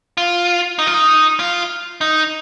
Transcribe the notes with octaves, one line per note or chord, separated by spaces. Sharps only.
F4
D#4
F4
D#4
F4
D#4